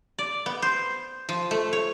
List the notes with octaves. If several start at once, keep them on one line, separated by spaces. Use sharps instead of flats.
D5
B3
C5
F3
A3
C#5